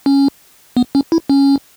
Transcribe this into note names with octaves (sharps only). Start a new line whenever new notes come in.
C#4
B3
C#4
E4
C#4